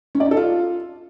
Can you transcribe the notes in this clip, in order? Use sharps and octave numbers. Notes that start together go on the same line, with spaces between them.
C#4
D5
D#4
A4
F4